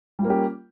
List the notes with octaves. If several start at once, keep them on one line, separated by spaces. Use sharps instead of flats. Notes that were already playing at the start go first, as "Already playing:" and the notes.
G3 A#3 C#4 F4 G4